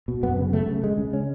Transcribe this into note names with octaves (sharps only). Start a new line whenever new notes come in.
B2
F#2 B3
C#3
C#3 A3
C#3
C#3 G#3
C#3
C#4